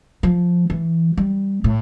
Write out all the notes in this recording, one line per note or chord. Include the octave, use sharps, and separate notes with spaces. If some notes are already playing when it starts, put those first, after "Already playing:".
F3
E3
G3
A2